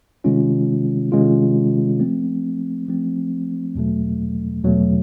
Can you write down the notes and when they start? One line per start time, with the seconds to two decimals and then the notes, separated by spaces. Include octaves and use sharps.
0.24 C3 D#3 G#3 C#4 F4
1.12 C3 D#3 G#3 C#4 F4
2.00 F3 A3 C4
2.88 F3 A3 C4
3.75 E2 B2 F#3 A3
4.63 E2 B2 F#3 A3